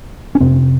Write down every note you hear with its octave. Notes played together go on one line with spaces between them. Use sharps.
C#4
F2 C3 C4